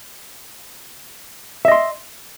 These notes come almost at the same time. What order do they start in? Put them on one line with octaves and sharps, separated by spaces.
E5 D#5 C6